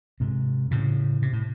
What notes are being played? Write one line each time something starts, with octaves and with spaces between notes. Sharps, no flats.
G#2 C3
A2 C#3
C3
A2